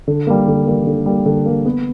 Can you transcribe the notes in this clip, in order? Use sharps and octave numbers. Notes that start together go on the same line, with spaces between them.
D3
G3 A#3
D3
G3 A#3
D3
G3 A#3
D3
G3 A#3
B3